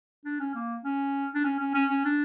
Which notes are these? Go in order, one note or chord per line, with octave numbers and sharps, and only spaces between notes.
D4
C#4
A#3
C#4
D4
C#4
C#4
C#4
C#4
D4